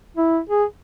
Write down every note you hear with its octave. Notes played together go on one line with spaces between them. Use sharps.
E4
G#4